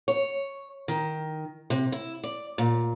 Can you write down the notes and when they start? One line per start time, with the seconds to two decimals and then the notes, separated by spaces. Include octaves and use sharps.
0.08 C#5
0.88 D#3
1.70 C3
1.92 E4
2.24 D5
2.58 A#2